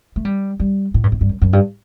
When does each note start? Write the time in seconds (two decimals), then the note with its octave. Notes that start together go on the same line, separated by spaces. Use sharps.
0.16 A3
0.25 G3
0.60 G3
0.94 A2
1.04 G2
1.12 A2
1.21 G2
1.29 F#2
1.42 F#2
1.53 G2